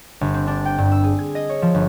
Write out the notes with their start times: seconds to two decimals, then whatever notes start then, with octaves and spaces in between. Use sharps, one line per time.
0.21 G1
0.34 C4
0.47 D4
0.65 G5
0.78 G2
0.92 E6
1.04 G#4
1.19 G#6
1.35 D#5
1.49 C#5
1.62 F3
1.74 G1